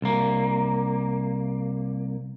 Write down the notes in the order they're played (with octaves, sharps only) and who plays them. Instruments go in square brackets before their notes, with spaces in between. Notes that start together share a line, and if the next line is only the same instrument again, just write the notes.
[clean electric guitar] C2 A#3